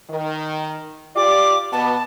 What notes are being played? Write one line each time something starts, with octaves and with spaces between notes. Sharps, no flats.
D#3
F4 G4 D5 D6
B2 B3 A5